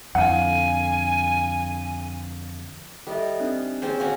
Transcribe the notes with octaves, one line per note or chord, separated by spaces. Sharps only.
F2 D3 F5 F#5 G#5
G3 A4 D#5 E5
C4 D4 D#4
C4 C#4 G#4 C5
C#4 F#4 C#5 F5